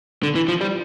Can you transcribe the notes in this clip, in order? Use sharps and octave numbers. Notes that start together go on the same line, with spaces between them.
D3
E3
F3
G3